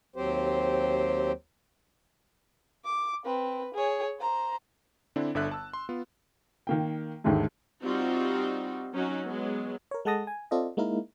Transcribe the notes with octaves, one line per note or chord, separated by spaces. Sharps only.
D#2 F#3 C4 G4 C5
D6
C4 B4
G#4 C#5
C5 A#5
D3 C4 D4 E4
G1 D3 E5 F#6
A5 E6
C6
B3 F4
D#3 A#3 G5
D#2 G#2 D3 G#3 A3
G3 C4 D#4 F4 F#4
F#3 C#4 D#4 F#4
F#3 G#3 B3
A#4 C#5
G#3 A4 F#5 A5 D#6 A#6
G#5
C4 F4 A4 D5 D#5
G#3 A#3 D#4 E4 A#4